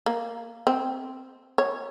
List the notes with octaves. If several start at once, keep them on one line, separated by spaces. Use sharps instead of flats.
A#3
C4
C#5